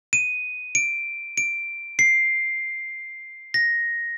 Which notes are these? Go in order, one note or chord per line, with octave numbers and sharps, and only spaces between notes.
D#7
D7
D7
C7
A#6